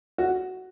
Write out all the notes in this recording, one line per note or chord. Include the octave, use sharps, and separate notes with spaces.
F#4